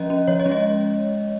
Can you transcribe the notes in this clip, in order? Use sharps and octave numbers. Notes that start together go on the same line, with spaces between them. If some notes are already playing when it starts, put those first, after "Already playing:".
Already playing: F3 C#4 D#5
C#4
F3 C#5
D#5
G#3 C#4
D#5